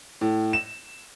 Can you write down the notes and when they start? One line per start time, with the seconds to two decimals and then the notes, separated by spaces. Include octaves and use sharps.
0.21 A2
0.53 E7